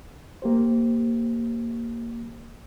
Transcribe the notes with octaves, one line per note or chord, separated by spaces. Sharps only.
A#3 G4 C5